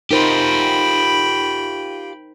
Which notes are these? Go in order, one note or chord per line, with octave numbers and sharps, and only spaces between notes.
D#4 F4 G4 A#4 C5 G5 B5